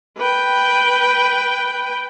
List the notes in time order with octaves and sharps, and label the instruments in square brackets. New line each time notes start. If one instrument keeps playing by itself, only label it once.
[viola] B4 G5